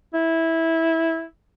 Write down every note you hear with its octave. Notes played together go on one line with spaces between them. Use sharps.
E4